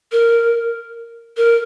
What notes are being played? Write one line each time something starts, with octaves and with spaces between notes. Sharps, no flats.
A#4
A#4